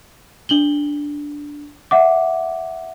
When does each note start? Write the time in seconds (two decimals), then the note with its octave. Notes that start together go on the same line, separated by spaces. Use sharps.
0.49 D4 F#7 G7
1.91 E5 F#5 D6